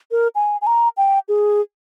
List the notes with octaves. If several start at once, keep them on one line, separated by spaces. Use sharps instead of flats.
A#4
G#5
G#5
A#5
G5
G#4